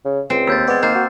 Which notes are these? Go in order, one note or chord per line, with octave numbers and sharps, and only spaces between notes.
C#3
C#2 C4
D#2 E6 G6 A6
G#3 B3 D5
D#3 A#3 C5
F#4